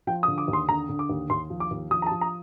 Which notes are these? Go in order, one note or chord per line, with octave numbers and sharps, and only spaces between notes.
F3 G5
D#6
D3
D6
D#2
C6
D3 A#5
D3
D6
D#2
D#2 C6
F3
D6
D#2
F3 D#6
A#5
A5
F3
A#5